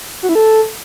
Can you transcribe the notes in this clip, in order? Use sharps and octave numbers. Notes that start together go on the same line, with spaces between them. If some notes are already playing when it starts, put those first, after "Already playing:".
F#4
E4
A4